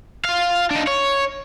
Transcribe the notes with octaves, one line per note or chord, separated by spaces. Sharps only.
F4 F5
D4 D#4
C#5